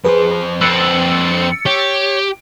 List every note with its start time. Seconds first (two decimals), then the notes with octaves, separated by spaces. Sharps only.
0.04 F2 G#4 B4 C5
0.61 C4 B4 E6 A6 C#7
1.66 G4 C#5